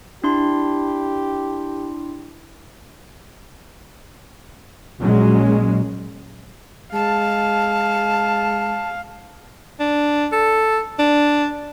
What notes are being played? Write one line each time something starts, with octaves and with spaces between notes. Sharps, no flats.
D4 E4 G4 C6
A#1 A#2 F#3 G#3 C#4
G#3 F5 A5
D4
A4
D4